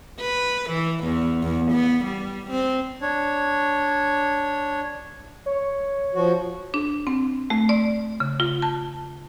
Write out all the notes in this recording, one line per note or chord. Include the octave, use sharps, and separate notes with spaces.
B4
E3
E2
E2
B3
G3
C4
D4 C#5
C#5
F3 F#4
D4
C4
A3
D5
C#3
F4
A5